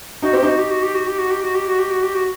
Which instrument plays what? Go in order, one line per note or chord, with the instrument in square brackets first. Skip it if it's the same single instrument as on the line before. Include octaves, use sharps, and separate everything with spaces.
[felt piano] D#4 [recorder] F#4
[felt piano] C4 [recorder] G4
[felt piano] D#4 [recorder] F#4
[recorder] G4
F#4
G4
F#4
G4
F#4
G4
F#4
G4
F#4
G4
F#4
G4
F#4